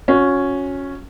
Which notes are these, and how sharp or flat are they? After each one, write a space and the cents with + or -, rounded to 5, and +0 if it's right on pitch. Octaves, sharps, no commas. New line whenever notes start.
C#4 +0 F#4 -30